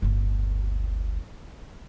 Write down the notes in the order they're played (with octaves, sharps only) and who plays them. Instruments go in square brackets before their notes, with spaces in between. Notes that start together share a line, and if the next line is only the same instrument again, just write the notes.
[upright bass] D1 G1